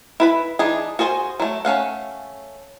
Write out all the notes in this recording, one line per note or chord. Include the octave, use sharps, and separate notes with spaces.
E4 B4 B5
E3 D4 D#4 G#4
F#4 G#4 C5 C#5 G#5
F#3 A3
A3 C#4 F5 F#5